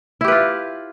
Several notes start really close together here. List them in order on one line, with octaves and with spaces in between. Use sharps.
E4 G4 B4 F4